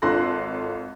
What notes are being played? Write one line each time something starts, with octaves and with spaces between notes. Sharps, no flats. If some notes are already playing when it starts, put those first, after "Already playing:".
G#1 F4 A4 C6 F#6 A#6